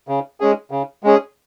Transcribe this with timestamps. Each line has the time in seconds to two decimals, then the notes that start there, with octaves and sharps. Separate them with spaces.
0.08 C#3
0.40 G#3 C#4 G#4
0.71 C#3
1.03 G#3 C#4 G#4